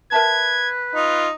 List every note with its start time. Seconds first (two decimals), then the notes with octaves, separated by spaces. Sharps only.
0.12 A#4 B4 E5 A5 G#6
0.95 D#4 F4